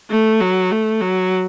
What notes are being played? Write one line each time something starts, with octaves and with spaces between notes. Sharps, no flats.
A3
F#3
A3
F#3